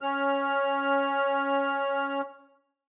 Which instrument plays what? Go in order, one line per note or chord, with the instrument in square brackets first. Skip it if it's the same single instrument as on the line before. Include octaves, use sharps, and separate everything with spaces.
[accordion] C#4 F6